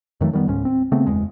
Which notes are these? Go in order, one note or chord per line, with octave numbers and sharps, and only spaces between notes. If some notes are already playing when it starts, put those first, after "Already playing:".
F2 D#3 F#3 A3
D#3 G3 A#3 B3
C#2 G#2 C#4
C4
C#3 A3 B3 C4
F#1 E2 G#3